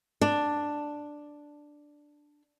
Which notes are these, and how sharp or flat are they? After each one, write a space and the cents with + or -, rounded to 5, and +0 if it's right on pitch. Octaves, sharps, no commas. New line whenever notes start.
D4 +5